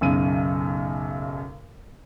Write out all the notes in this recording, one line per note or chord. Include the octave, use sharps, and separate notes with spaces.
B1 F#2 C#3 D#7